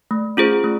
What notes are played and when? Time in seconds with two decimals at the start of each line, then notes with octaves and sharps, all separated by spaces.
0.11 A3
0.37 C#4 F4 G#4 C5
0.64 A3